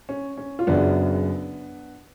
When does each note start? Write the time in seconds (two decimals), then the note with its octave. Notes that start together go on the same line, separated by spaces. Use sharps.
0.09 C#4
0.37 C#4
0.59 F4
0.67 F#1 F#2 C#3 F#3 B3 D4